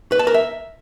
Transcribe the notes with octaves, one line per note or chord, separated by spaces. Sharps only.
B4
A5
A#4
E5